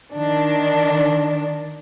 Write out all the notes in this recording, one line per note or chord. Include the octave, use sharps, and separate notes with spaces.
D#3 D4